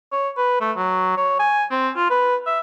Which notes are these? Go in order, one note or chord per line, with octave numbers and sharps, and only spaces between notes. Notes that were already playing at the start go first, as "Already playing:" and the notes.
C#5
B4
A3
F#3
C#5
G#5
C4
F4
B4
E5